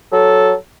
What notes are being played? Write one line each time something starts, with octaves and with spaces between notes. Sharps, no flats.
F#3 A4